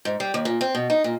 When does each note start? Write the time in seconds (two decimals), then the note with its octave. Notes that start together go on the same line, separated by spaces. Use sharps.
0.05 G#2
0.20 G3
0.34 D#2
0.45 A#2
0.61 C4
0.75 B2
0.90 D#4
1.04 A#2